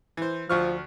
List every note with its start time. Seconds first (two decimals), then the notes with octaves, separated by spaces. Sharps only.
0.17 E3 C5
0.49 D2 F3 C#6 F6